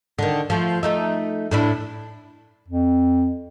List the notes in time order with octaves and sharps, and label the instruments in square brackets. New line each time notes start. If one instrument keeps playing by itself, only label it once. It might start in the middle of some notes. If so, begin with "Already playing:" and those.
[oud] D3 D#3
F3 A3
A3 D#4 E5
A2 D4 E4
[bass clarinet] F2